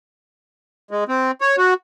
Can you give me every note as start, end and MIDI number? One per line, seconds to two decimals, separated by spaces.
0.91 1.04 56
1.09 1.31 60
1.41 1.56 73
1.58 1.74 66